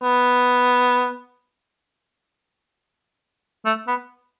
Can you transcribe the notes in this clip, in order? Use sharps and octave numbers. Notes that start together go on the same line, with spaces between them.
B3
A3
B3